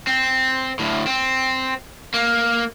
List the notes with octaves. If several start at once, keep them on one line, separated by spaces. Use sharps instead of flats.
C4
D2 A2
C4
A#3